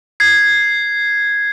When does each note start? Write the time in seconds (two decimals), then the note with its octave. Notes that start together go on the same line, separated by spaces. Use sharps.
0.20 G#6 C7